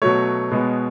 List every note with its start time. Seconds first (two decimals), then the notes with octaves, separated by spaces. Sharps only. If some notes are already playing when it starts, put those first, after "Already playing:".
0.02 B2 F#3 A3 C#5
0.51 B2 G#3 B3